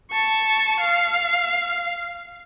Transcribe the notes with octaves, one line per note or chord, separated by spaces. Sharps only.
A5 C#6
F5